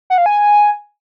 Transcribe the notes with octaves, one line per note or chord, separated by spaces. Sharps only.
F#5
F5
G#5